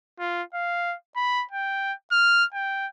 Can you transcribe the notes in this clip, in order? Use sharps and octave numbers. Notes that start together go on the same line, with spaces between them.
F4
F5
B5
G5
F6
G5